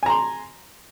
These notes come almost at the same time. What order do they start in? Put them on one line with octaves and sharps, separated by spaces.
G#5 A#5 C6